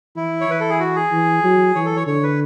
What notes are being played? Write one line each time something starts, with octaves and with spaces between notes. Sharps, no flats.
E3 E4
C#5
E3 B4
A4
G#4
F#4
G#4
E3
F#3
E3 C#5
A4
C#5
D3 C#5
B4